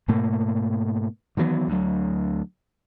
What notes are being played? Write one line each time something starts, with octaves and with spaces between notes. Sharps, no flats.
G#2 B2 A3 A#3
D#3 E3 F#3 B3
D2 F#3